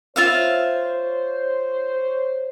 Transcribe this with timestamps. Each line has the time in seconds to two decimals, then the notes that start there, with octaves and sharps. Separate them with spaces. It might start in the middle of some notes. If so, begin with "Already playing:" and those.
0.16 F4 C5 C#5 E5 F5